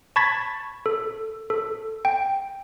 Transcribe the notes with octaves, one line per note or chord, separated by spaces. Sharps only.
A5 B5 C#6 G#6 A6 B6
A4
A4
G5